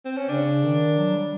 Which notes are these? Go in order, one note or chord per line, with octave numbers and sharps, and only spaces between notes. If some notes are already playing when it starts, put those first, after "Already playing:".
C4
C#4
C#3 D4
D#3
F#3
G3